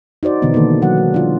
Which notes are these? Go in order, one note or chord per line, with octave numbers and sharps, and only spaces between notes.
D#4 F#4 C5 D5
B2 D3 E3 B3
D#3 E3 A#3 A4
F#3 F#5
G#3
D4 F4